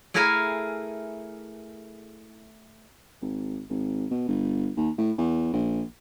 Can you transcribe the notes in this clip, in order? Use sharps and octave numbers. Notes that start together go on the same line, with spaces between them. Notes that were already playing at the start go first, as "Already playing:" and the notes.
A3 E4 G#4 A#4 F5 G#5
G#1
G#1
B2
G1
D#2
A2
E2
A#1